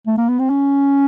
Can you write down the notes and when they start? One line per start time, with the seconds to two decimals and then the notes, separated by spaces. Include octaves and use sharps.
0.07 A3
0.18 A#3
0.29 B3
0.39 C4
0.50 C#4